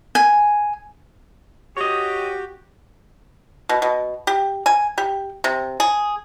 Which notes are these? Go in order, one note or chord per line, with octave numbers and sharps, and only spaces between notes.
G#5
F#4 G4 C#5 D#5
B2
B2
G4
G#5
G4
C3
G#4